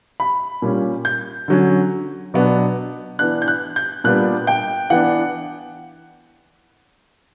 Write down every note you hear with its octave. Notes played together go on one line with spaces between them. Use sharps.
B5
A#2 G3 C#4
G6
D3 F#3 C#4
B2 F#3 B3 D4
E3 B3 D4 F#6
G6
F#6
G6
A#2 G3 B3 D4 F#6
G5
E3 B3 D4 F#5